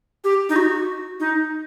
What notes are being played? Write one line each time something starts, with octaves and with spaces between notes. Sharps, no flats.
G4
D#4
F#4
D#4